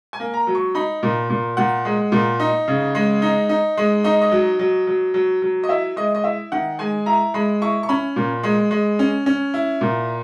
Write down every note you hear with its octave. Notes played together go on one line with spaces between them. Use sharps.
G#5
A#3
A#5
F#3
C#6
D#4 B5
A#2
A#2
A#2 F#5
G#3
A#2
D#4
C#3
G#3
D#4
D#4
G#3
D#4 D#5
D#5
F#3
F#3
F#3
F#3
F#3
D#5
E4 E5
G#3 D#5
D#5
E4 E5
D#3 F#5
G#3 G#5
E4 A#5
G#3 B5
E4 C#6
C#6
C#4 B5
A#2
G#3
G#3
C#4
C#4
E4
A#2